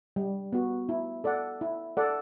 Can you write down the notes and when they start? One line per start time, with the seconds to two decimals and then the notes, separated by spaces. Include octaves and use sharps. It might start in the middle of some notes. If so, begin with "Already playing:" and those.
0.16 G3
0.53 B3 F#4
0.89 E4
1.24 A4 D5 F#5
1.61 E4
1.97 A4 D5 F#5